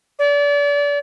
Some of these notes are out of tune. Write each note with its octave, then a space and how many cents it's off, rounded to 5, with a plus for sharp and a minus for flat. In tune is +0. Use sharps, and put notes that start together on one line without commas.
D5 -30